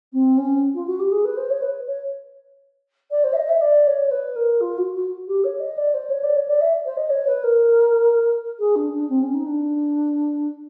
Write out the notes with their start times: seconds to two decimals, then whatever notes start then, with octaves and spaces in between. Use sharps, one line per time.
0.13 C4
0.37 C#4
0.74 F4
0.87 F#4
0.99 G4
1.11 G#4
1.24 B4
1.36 C5
1.49 C#5
1.61 B4
1.87 C#5
3.11 D5
3.23 C5
3.32 E5
3.35 D#5
3.48 E5
3.61 D5
3.86 C#5
4.11 B4
4.35 A#4
4.60 F4
4.77 F#4
4.94 F#4
5.27 G4
5.44 C#5
5.60 D#5
5.77 D5
5.93 C5
6.09 C#5
6.23 D5
6.36 C#5
6.47 D5
6.60 E5
6.85 C5
6.97 D#5
7.09 C#5
7.27 B4
7.43 A#4
8.59 G#4
8.75 D4
8.93 D4
9.09 C4
9.22 C#4
9.33 D#4
9.46 D4